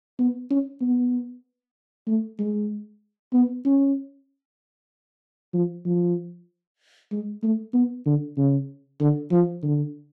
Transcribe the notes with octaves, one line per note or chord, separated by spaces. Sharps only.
B3
C#4
B3
A3
G#3
B3
C#4
F3
F3
G#3
A3
B3
D3
C#3
D3
F3
D3